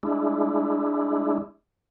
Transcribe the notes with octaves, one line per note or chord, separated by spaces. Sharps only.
G#3 D4 E4